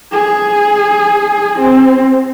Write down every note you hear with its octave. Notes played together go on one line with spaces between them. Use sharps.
G#4
C4